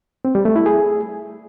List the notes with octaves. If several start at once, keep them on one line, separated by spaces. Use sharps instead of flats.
C4
G3
A3
E4
G#4